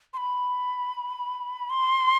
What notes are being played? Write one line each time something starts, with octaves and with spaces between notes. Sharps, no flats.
C6
B5
C6